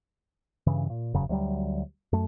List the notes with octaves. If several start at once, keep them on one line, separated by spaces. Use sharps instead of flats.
G2 C#3 E3
A#2
E1 F#2 C#3 F#3
D2 F#3 G3
F#2 A3